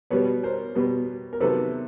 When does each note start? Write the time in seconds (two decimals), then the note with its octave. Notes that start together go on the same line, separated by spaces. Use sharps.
0.10 B2 G3 B3 B4 C#5
0.43 A#4 C5
0.75 B2 G3 B3
1.33 A#4
1.40 C3 D#3 F#3 B3 A4 B4